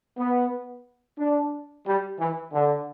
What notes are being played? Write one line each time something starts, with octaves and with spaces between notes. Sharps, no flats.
B3
D4
G3
E3
D3